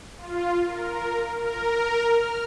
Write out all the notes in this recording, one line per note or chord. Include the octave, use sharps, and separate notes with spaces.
F4
A#4
A#4
F6